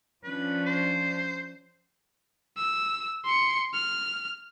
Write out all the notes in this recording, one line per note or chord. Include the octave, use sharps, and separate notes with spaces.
F3 C#4 D4 B4
C5
E6
C6 C#7
F6